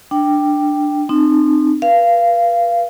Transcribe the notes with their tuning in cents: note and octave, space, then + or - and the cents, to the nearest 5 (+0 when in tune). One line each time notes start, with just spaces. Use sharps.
D4 +10 G5 +0
C4 +0 D#4 -35
B4 -35 F5 -20